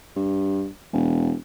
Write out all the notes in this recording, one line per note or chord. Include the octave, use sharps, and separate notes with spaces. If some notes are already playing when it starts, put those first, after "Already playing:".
G2
E1